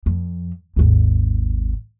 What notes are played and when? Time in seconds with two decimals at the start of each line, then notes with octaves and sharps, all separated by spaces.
0.06 F2
0.76 G#1 D#2